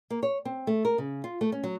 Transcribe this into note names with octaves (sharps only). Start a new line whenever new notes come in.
A#3
C#5
C4
A3
A#4
C#3
F4
A3
C#4
F#3